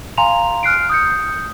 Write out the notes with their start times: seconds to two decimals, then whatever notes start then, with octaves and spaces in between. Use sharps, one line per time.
0.18 F5 G#5 A#5 C6 F7
0.63 F6 F#6 C7 D7
0.90 D#6 G6 C#7